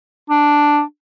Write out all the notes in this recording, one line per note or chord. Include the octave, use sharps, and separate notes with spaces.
D4